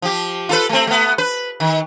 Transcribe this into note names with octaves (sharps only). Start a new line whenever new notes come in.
F3 G4
F4 A4 B4
A3 C4
A3 B3
B4
D#3